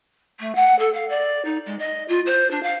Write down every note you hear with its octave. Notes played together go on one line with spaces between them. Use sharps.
A3
F#5
A4
F5
D5
D#4
G#3
D#5
F4
C5
D4
F5